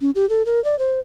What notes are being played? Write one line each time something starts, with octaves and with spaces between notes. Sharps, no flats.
C#4
G4
A4
A#4
D5
C5